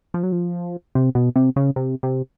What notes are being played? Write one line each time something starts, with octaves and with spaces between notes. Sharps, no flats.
F3
F#3
F3
C3
B2
C3
C#3
C3
C3